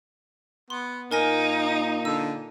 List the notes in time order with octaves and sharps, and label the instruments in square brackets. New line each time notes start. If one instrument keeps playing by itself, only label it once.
[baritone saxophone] B3 [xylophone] C6
[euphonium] A#2 [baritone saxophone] A#3 [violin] D#4 [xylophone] A#4 G#5 A#6
[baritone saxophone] D3 [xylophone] E6